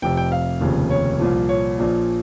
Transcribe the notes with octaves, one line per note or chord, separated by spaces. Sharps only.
F1 F2 C3 G5
G5
F5
F1 D#2 C#3 F3
C#5
C2 A#2 F3
C#5
A#1 A#2 F3